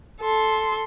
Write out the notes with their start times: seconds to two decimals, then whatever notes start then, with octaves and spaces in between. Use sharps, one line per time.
0.20 A4 C6